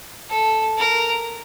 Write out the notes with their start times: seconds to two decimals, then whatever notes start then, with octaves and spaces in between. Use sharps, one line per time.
0.30 A4
0.78 A#4